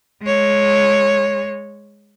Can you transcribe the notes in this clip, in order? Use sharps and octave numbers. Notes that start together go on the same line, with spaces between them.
G#3 C#5